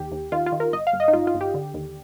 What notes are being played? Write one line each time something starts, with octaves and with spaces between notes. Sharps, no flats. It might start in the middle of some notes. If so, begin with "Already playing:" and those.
Already playing: D#2 G4
D#2
D#3 F4
F4
D#3
A#4
G1 D#5
F5
G1
D#5
D#4
G1 F4
F4
G1
G4
D3
D#2